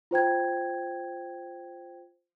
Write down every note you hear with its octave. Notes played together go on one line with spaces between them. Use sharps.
F4 C5 G5 G#6